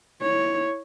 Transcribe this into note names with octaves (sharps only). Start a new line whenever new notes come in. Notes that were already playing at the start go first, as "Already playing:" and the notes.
E4 C#5